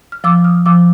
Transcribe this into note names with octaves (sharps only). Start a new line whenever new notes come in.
F6
F3 D6 E6
D#6 F6
F3 D6 E6